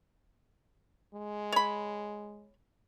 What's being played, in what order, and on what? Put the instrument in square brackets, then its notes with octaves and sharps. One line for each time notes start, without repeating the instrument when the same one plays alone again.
[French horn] G#3
[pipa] C#5 B5